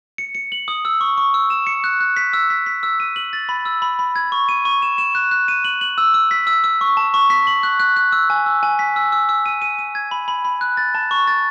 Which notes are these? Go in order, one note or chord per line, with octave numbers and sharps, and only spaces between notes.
C#7
C#7
F#7
D#6
E6
C#6
C#6
E6
E7
C#7
F#6
F#6
B6
E6
B6
B6
E6
D#7
F#7
A6
B5
E6
B5
B5
G#6
C#6
D#7
C#6
E7
E7
F#6
F#6
D#7
F#7
F#7
E6
E6
B6
E6
E6
C#6
A5
C#6
B6
F#7
F#6
F#6
F#6
E6
G#5
E6
G#5
B6
E6
E6
E6
D#7
D#7
D#7
G#6
B5
B5
B5
F#6
A6
A5
C#6
A6